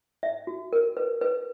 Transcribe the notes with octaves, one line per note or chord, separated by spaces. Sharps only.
E5
F#4
A#4
B4
B4